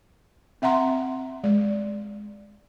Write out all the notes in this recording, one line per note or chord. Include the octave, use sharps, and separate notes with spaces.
C4 E5 F#5 A#5 C6
G#3 D5